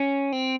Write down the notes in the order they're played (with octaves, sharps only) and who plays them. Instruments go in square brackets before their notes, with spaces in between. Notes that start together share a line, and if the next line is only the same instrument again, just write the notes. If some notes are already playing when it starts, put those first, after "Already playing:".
Already playing: [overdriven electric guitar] C#4
C4